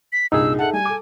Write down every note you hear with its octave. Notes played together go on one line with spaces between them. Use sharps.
B6
C2 G2 A#2 D#4 G#4 E6
A4 E5 F#5 A5
G3 G#5
A4 D6